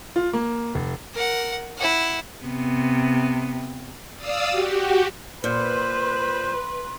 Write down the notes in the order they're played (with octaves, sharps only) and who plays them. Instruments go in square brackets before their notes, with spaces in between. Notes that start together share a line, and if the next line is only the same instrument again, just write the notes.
[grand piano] F4
A#3
F1
[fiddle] A#4 F#5
E4 F#5
[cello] C3 B3
[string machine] D5 F5 D#6 E6
F#4 G4
[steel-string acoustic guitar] A#2 [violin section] B4 [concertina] C5 [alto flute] C6